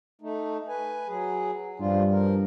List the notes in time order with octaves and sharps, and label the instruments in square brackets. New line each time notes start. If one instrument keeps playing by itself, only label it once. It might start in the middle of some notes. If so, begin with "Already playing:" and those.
[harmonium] A3 D#4
B4 G#5
F#3 G#4
[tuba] G2 [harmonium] F3 G3 F4
[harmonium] F3 A#4